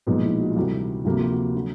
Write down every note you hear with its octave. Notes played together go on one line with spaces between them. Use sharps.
B1 A#2 F3 G#3 B3 D#4
E4
F#4
F4
D2 C3 E3 G3 F#4
D2 C3 F3 A#3 F#4
F4
F#4
D3 F#3